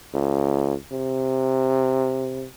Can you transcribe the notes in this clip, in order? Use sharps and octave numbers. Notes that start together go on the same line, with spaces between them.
C#2
C3